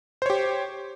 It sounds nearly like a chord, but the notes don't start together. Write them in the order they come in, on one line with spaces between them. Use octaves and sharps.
C5 C#5 G4